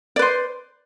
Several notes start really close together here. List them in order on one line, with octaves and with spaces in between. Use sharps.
D5 B4 C5